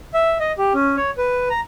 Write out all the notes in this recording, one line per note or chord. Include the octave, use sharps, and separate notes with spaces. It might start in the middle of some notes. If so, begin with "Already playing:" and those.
E5
D#5
G4
C#4
C#5
B4
A#5